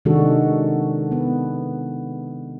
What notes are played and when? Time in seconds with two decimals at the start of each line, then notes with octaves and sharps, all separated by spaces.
0.05 C3 D#3 G#3 D4 F#4 A4
1.12 B3